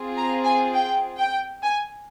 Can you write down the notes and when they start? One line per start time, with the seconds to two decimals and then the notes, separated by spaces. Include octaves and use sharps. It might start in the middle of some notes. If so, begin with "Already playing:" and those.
Already playing: C4 F4 G#4
0.16 A#5
0.45 G#5
0.74 G5
1.19 G5
1.63 G#5